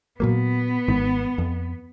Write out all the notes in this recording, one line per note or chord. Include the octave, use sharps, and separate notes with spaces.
A#2 F#3 A#3 B3
G#1 G#2 D#3
F2